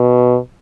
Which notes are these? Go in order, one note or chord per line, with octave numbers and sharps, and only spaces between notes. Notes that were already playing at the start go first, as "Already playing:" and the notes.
Already playing: B2